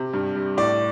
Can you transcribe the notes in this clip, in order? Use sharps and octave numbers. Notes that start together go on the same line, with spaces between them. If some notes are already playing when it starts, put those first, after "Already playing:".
Already playing: C3
G2
G3
A2 D5